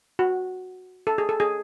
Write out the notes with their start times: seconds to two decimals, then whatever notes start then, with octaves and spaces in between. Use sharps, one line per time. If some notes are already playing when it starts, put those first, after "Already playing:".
0.19 F#4
1.07 A4
1.18 G#4
1.29 A4
1.40 G#4